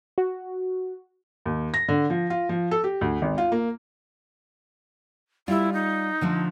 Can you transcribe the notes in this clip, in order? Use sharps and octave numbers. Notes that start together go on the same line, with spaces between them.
F#4
D#2
A#6
D3
F3
F4
F3
A4
G4
D2
G#1
F4
A#3
G3 E4 F4
D#4
D3 F3 A3